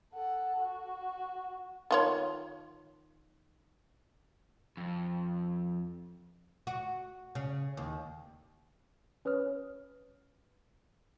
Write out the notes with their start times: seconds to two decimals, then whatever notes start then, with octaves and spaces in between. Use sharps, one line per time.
0.14 A4 F#5
0.60 F#4
1.91 D#3 F4 C#5
4.77 F2
6.67 F#4
7.35 C#3
7.77 D#2
9.25 C#4 B4 C#5 D#6 F6